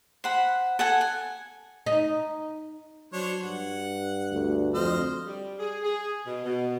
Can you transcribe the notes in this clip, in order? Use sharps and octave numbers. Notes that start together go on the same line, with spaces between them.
C5 F#5 B5
A4 F#5 G#5
G#5
D#4
F#3 D4 C5 C#5
G2 F#5
D2
F2 C5 D#5 F6
G3
G#4
G#4
B2
B2